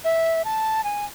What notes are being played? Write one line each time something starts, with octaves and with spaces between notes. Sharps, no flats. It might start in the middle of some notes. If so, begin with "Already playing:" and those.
E5
A5
G#5